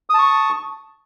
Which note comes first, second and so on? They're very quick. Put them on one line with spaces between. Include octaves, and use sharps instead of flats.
D#6 A5 C#6